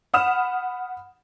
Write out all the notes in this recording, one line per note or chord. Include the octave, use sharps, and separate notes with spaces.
F#5 B5 D#6 F6 E7